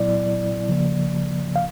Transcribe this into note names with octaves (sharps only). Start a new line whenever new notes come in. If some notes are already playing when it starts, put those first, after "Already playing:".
Already playing: A#2 F#3 B3 E4 D5
C#3 F3 A#3
F5